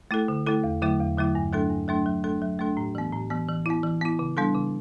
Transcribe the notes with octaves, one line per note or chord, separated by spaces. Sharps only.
A3 E4 A4
D3
A3 E4 A4
E2
D3 F#3 A3 E4
E2
D3 F#3 A3 E4
G2
F#3 A3 D4 A4
G2
F#3 A3 D4 A4
F#3
A3 D4 A4
F#3
A3 D4 A4
A2
E3 B3
A2
E3 B3
E3
B3 E4
E3
B3 E4
C#3
G3 B3 D4 A4
C#3